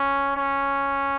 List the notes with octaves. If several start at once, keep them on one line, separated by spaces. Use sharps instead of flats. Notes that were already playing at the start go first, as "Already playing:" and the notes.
Already playing: C#4
C#4